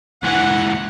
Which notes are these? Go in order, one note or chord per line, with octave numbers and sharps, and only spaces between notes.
C#2 E3 F#5